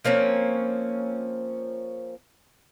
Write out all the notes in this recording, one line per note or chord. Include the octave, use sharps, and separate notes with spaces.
F3 A#3 C4 C#4